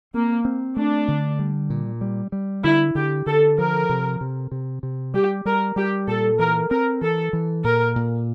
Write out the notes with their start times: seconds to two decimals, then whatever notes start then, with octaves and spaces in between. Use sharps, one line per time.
0.14 A#3 C4
0.45 C4
0.77 A3 D4
1.08 D3
1.39 G3
1.70 A#2
2.01 G3
2.32 G3
2.64 D3 E4
2.95 D3 G4
3.26 D3 A4
3.57 F3 A#4
3.90 C3
4.21 C3
4.52 C3
4.83 C3
5.14 G3 G4
5.45 G3 A#4
5.76 G3 G4
6.08 A#2 A4
6.39 E3 A#4
6.71 C4 A#4
7.01 E3 A4
7.33 E3
7.64 A#2 A#4
7.96 A#2